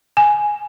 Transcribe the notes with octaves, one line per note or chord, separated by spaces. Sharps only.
G#5